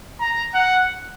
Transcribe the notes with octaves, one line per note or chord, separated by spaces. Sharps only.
A#5
F#5